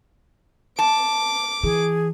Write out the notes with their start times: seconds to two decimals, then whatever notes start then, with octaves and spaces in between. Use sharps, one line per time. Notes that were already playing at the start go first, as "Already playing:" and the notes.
0.79 A5 D6
1.63 E3 G#4